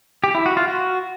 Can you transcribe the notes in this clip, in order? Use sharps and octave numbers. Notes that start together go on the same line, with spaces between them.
G4
E4
F#4
F4
F#4